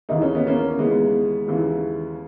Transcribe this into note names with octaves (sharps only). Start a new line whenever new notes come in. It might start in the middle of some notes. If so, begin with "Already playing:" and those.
D#2 C#3 E3 D#4
C#4
B3
A#3 C#4
D#2 C#3 E3 G#3 B3
D#2 C#3 E3